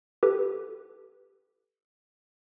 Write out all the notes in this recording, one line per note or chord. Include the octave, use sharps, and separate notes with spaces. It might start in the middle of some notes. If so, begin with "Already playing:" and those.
G4 A4 B4